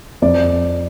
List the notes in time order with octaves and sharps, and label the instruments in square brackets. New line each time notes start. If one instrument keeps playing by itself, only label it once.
[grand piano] F2 D5